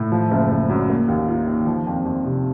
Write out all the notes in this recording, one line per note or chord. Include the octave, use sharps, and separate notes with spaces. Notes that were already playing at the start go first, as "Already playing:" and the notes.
Already playing: A2
F3
F#1
F#1
F#2
A#3
D#2
F4
D#3
F3
F2
F2
C3